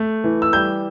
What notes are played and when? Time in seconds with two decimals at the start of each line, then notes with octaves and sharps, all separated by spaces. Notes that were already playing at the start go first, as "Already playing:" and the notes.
Already playing: A3
0.24 E3
0.42 E6
0.53 G3 G6